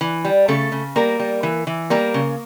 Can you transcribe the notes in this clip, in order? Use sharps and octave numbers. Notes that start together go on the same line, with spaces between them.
E3
G3
C#3 A3 A4
C#3
G3 A#3 A#4
G3
E3
E3
G3 A#3 A#4
C#3